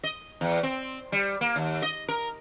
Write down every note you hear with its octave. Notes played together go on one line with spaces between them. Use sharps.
D#5
E2
C4
G3
A#3
D#2
D#5
A#4